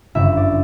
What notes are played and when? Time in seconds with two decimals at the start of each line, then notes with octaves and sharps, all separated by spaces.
0.15 G1 F#2 C#3 E5
0.37 D5